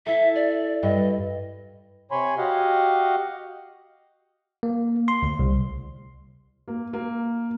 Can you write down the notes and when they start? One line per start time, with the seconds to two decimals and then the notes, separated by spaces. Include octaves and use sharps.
0.06 E4 A4 E5
0.35 D5
0.83 G2 D#5
2.11 C3 C#5 G#5 B5 C6
2.38 F#4 G4 D#5 F5 F#5
4.63 A#3
5.08 C6
5.23 D2
5.39 C2
6.68 A#3
6.93 A#3